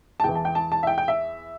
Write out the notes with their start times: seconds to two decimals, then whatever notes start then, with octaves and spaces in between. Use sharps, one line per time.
0.20 A5
0.24 E2 E3 G5
0.35 A5
0.45 G5
0.55 A5
0.72 A5
0.83 E5
0.87 G5
0.98 G5
1.08 E5